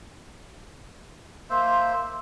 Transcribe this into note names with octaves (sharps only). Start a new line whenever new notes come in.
A#3 C5 E5 C6